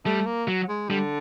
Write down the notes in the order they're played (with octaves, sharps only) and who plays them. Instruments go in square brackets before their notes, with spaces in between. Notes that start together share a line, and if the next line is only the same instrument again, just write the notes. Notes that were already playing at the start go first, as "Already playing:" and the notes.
[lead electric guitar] G3 [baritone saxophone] A3
[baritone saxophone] A#3
[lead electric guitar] F#3
[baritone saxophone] G#3
[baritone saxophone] D3 [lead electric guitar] G3